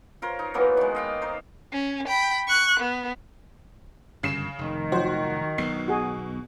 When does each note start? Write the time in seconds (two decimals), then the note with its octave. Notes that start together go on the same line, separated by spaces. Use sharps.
0.22 F4 A#4 C5 C#5
0.39 D#4
0.54 E3 F#3 A#3 B3
0.77 D#3 G#3
0.95 D#5 F5 G5
1.22 D#4 C5
1.72 C#4
2.07 G5 B5
2.48 C#6 F#6
2.80 B3
4.23 G1 F#2 C#3 C7 E7
4.59 F1 D#3
4.92 F3 F#3 F#4 C5
5.58 B1 B2 C7
5.88 F#4 G#4